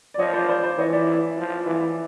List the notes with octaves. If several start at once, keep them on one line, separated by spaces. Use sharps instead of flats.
D5
F3 C#5 D#5
C5 D5
C5 D5
C5 D5
E3 C#5 D#5
D5 E5
F3
E3